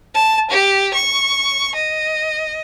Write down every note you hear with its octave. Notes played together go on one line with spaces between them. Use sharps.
A5
G4
C#6
D#5